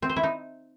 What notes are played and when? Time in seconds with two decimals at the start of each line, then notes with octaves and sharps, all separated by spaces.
0.02 C4
0.09 C5
0.16 E4
0.23 D#4